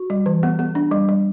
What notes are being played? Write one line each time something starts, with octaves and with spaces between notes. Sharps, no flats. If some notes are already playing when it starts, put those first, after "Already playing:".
Already playing: F#4
G3
E3
B3
B3
D4
G3
G3